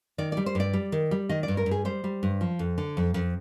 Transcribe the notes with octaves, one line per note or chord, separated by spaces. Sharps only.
D#3 D5
G3 D5
C5
G2 D5
G3
D#3
G3
D#3 D#5
D5
G2
A#4
G2
G#4
G3 C5
G3
G2
F3
F2
D3
F2
F2